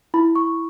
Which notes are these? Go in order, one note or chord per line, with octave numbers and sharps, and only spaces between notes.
E4 B5
C#6